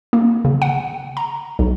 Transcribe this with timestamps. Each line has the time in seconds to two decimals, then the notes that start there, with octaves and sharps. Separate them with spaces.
0.13 A#3
0.45 C#3
0.62 F#5
1.17 A#5
1.59 B1